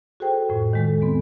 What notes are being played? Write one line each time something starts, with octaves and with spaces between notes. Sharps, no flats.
F#4 G#4 A4 C5 G5
F2 A2
D#3 G#3 A4
E2 B3 C4